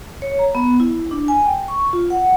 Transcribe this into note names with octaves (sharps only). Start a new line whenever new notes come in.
C#5
A#5
B3
E4
D4
G#5
G5
C#6
F4
F#5